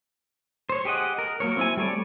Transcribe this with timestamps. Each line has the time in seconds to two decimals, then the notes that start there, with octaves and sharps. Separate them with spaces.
0.69 C5 C#5
0.85 G4 G#4 D#5 F#5
1.18 A#4
1.40 F#3 A#3 A#4 C#5
1.57 C4 E4 G#5
1.77 G3 A3 C#5 D5